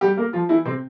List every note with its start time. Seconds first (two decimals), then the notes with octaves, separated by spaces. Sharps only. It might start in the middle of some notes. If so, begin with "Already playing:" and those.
0.01 G3 G4
0.17 A#3 A#4
0.33 F3 F4
0.49 E3 E4
0.65 C3 C4